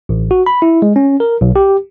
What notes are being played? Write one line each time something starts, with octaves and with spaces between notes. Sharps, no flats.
A1
F#4
B5
E4
G#3
C#4
A#4
B1
G4